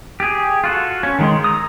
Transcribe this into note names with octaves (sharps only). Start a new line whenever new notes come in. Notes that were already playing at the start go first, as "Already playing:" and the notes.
G4 G#4
F4 F#4 A4
C#4
D#3 G#3 C6
A#5 D#6